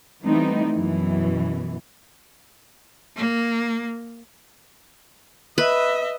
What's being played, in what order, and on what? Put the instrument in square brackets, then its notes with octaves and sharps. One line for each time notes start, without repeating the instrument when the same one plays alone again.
[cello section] E3 G3 A3 B3 C4 D#4
F#2 B2 E3
[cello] A#3
[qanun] B4 [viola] D#5 E5